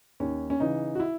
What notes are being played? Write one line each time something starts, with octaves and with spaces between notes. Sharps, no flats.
D#2 C#4
C#4
C#3 E3 D#4
F#4
E4